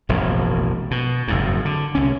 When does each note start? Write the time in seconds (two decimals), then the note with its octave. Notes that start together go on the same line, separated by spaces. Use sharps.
0.09 E1 A#1 F#2 A2
0.91 B2
1.28 F#1 F2 G#2
1.65 D3
1.95 C2 C#4